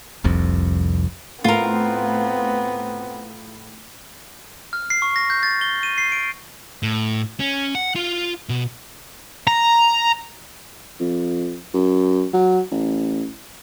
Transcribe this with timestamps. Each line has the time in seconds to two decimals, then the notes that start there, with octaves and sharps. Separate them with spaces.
0.24 F1 C2 F2
1.44 A2 B3 C4 F4 A#4
4.73 F6
4.90 C7
5.02 C#6
5.16 A#6
5.30 G6
5.43 A6
5.61 G7
5.83 D#7
5.98 C7
6.12 D7
6.83 A2
7.40 C#4
7.75 F#5
7.96 F4
8.49 B2
9.47 A#5
11.00 F2
11.73 F#2
12.33 F#3
12.71 A1